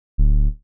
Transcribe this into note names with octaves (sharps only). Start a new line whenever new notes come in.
D1